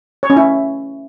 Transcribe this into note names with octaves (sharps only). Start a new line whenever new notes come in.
C#5
C#4
E4